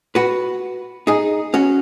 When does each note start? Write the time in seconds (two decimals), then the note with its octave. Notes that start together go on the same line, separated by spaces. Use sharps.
0.15 F#4 B4
1.07 D#4 G#4
1.54 C#4 F#4